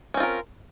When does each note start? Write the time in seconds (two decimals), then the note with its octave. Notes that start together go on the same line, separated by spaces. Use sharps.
0.14 C#4
0.17 C4
0.20 F4
0.23 A#4